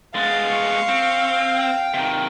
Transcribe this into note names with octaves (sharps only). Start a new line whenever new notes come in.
G#3 B3 F5 A6
C#6
C4
G5
C3 D#3